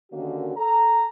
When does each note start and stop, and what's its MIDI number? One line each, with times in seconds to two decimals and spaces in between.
0.12 0.53 39
0.12 0.53 50
0.12 0.53 51
0.12 0.53 58
0.12 0.53 61
0.12 0.53 66
0.57 1.08 69
0.57 1.08 82